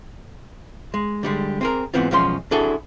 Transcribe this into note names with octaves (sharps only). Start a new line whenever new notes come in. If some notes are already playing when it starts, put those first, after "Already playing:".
G#3
D3 G3 G#3
C4 G#4 A#4
G#2 E3 G#3 B3 C4 F4
B1 E2 F3 G#3 C#4 C6
D4 E4 F#4 G#4 A4